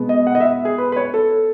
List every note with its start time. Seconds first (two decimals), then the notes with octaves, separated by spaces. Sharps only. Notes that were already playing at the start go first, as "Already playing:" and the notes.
Already playing: B2 G#3 B3
0.09 D#5
0.27 F#5
0.35 D#5
0.40 E5
0.65 G#4
0.78 B4
0.92 B4
0.96 C#5
1.14 A4